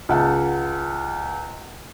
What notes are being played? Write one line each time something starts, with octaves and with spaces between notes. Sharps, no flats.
C#2 F#5 A5